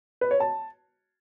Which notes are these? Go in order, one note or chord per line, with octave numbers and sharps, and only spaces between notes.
B4
C#5
A5